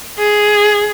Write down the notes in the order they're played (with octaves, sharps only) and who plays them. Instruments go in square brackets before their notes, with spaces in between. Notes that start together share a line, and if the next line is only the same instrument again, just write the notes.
[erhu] G#4